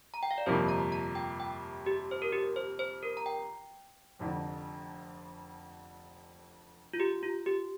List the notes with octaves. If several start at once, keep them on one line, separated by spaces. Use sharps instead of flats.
A#5
G5
F5
D5
G1 F2 C3 F3 A#3 C5
A#5
A#5
G5
G5
G4
C5
A#4
G4
C5
C5
A#4
A#5
G5
F1 F2 D3
F4
G4
F4
G4